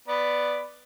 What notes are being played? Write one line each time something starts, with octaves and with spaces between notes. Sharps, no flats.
B3 D5 B5